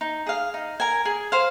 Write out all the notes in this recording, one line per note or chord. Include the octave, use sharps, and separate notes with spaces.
D#4
G#4 F5
D#4
A#4 G#5
G#4
C5 F5